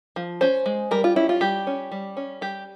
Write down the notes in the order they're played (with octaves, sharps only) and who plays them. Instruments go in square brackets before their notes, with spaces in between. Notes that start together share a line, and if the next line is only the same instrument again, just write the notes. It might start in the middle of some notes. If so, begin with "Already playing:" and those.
[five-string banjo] F3
C#4 C5
G#3
G3 A#4
F4
C#4 E4
F4
G3 G4
C#4
G3
C#4
G3 G4